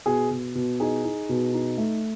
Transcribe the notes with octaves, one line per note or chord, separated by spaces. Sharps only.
B2 G#4
B2
B2
D#4 G#4
D#4
B2
D#4
A3